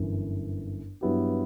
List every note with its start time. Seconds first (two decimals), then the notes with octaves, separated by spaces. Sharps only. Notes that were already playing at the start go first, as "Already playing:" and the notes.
Already playing: G1 F#2 E3
1.01 G2 F#3 B3 E4 G4